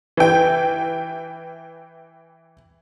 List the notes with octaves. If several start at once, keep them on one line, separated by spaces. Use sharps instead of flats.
E3 G5